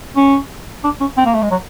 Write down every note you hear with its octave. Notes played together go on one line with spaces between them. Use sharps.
C#4
D4
C#4
C4
A#3
A3
G#3
F#3